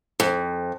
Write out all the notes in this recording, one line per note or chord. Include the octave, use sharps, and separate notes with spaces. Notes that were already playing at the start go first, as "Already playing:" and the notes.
F2